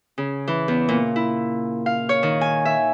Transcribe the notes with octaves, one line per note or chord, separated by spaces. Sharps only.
C#3
E3
E2
A#2
E4
F5
C#5
D#3
G#5
E5